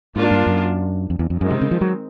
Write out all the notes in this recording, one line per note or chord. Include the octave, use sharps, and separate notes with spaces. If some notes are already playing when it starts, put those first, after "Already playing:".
G#2 A#3 D4 F4
G2
F#2
F2
E2
F2
F#2 D#3 G#3 C4 D#4
C3
C#3
F3
F#3